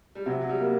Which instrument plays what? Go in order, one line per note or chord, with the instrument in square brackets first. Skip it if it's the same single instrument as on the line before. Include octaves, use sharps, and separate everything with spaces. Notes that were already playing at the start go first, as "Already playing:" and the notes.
[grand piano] G3
[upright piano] C3 [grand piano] F#3
[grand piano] F#3
G3
[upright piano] A#3